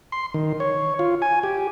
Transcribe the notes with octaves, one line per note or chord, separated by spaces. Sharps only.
C6
D#3
C#5
F4
G#5
G4